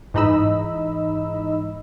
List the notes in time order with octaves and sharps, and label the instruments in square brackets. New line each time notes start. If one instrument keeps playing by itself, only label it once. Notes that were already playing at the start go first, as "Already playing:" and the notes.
[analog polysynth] G#2 E3 D#4 D#5 B5 E6